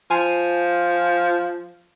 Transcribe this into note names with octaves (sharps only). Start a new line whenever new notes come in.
F3 G#5